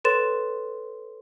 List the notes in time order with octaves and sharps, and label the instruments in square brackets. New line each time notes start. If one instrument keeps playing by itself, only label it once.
[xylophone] A4 B4 C#5 C6 A6 E7